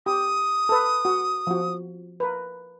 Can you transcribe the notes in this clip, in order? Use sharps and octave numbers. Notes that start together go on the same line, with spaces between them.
G4 D#6
A4 B4
F#4
F3 F#4
A#4 B4